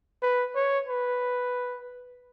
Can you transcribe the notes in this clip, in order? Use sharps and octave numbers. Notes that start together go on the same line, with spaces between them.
B4
C#5
B4